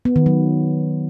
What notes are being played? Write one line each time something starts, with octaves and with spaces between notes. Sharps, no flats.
B3
D#3
F#3